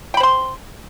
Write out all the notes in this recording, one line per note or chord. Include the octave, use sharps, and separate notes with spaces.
C5 G5 B5 C6